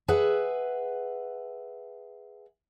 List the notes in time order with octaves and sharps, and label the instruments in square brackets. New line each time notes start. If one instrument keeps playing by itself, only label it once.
[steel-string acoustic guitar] G#4 B4 E5 F#5